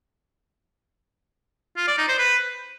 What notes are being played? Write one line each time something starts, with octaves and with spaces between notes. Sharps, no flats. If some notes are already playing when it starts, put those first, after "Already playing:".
F4
D5
D#4
C5
B4